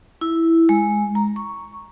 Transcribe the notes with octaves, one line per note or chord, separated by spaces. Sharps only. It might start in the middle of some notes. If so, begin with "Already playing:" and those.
E4
G#3
A#5
C#6